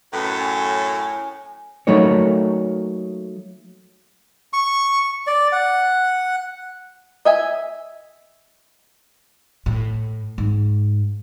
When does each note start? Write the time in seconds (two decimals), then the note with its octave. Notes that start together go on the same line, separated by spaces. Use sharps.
0.13 F#2 A2 B4
0.39 C#4
1.87 F#3 A3 A#3 D#4 C#5
4.53 C#6
5.27 D5
5.52 F#5
7.25 D#5 E5 G#5
9.66 A2
10.38 G#2